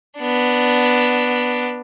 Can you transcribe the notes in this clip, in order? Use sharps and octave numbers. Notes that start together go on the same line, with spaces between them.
B3 D4